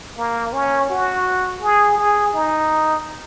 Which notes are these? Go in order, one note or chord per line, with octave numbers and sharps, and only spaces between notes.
A#3
C#4
F#4
G#4
G#4
D#4